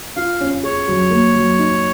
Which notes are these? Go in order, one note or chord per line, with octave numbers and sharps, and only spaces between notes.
F4 F5
C#4
G#4 C#5
F#3
A#3
F#3
D#4